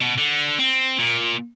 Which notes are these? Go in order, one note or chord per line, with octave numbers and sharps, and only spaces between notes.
B2
D3
C4
A#2